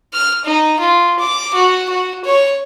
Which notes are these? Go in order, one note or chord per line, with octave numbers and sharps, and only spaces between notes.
F6
D#4
F4
D6
F#4
F#4
C#5